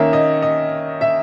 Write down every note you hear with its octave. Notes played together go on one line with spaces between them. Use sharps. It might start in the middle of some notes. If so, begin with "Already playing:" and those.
Already playing: D#3 A#3 C#4 E5
D#5
D#5
E5